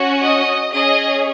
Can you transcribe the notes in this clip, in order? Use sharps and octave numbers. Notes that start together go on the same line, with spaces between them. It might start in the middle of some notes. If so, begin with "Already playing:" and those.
Already playing: C#4 F#4
D#5
C#4 G#4 D#5